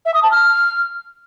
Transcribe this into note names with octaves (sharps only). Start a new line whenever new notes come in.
E5
D#6
A5
F6